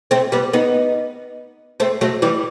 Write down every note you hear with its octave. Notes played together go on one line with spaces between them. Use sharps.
A3 C4
G3 B3
B3 D#4
A3 C4
F#3 A3
E3 G3